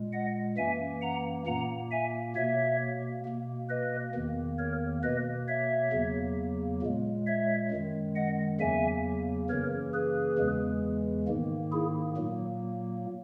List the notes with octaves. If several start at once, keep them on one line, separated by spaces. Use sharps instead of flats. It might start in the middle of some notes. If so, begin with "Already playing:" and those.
Already playing: A#2 G#3
D#5 F#5
F#2 E3 A#3 E5 G#5
F#5 A#5
A#2 A#3 F#5 A#5
E5 G#5
B2 A#3 C#5 E5
B2 A#3
B4 D#5
E2 D#3 A#3
A#4 C#5
B2 A#3 B4 D#5
C#5 E5
E2 C#3 F#3 A#3
A#2 G#3
C#5 E5
F#2 D#3 G#3
D#5 F#5
E2 C#3 F#3 A#3 E5 G#5
F#2 C#3 E3 A#3 A#4 C#5
G#4 B4
E2 C#3 E3 G#3
G#2 D#3 A#3
E4 G#4
A#2 F#3 A#3